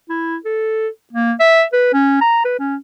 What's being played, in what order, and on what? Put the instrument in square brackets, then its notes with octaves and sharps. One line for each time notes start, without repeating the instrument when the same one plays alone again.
[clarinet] E4
A4
A#3
E5
B4
C#4
A#5
B4
C#4